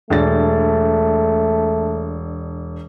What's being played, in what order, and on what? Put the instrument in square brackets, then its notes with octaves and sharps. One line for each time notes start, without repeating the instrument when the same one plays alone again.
[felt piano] E1 D4 A6 [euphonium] A3